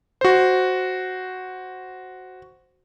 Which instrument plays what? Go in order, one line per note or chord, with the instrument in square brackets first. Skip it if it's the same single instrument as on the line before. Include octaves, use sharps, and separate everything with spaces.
[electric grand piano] F#4 C5